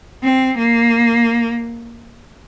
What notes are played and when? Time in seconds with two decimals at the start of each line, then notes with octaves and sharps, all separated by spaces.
0.23 C4
0.58 A#3